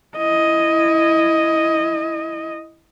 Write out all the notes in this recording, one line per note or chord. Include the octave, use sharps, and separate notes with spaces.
E4 D#5